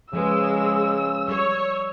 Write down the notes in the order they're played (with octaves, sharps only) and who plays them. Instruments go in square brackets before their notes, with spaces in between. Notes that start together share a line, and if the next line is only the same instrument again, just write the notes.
[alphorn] C#3 [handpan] F3 B4 [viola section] G#3 [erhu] E6
[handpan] G3 [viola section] C#5